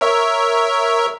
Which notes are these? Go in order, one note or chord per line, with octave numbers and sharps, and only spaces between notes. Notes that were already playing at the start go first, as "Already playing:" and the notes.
A#4 C#5 E5